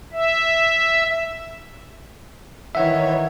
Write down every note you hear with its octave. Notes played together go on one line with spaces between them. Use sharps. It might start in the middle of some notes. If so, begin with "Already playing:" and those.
E5
D#3 E3 C#5 E5 F#5